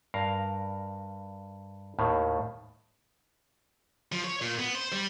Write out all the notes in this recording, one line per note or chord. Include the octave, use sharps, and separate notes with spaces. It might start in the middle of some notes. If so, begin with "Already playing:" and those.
G2 A#4 F5 A#5
D#2 A2 D#3
F3
C#5
A#2
B3
C5
G3